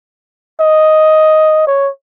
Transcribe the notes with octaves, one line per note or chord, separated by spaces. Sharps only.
D#5
C#5